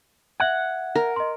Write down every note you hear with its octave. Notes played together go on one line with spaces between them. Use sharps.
E5 F#5 F#6 G#6
A#4
D#5 C6